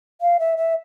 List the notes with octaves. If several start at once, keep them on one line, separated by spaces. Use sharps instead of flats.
F5
E5
E5